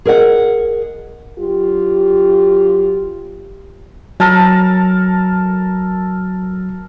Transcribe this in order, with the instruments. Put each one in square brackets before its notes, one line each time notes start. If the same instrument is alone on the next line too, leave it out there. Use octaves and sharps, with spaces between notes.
[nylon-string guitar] G#4 A#4 D#5 F#5
[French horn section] F#3 F4 G4
[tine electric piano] F#3 [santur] A4 A#4 A5